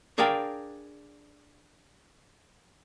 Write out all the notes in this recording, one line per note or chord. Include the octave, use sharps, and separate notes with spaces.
D4 G#4 A#4 F5 G5 A5